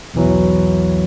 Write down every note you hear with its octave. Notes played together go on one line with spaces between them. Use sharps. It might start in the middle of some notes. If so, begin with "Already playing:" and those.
B1 E2 E3 F#3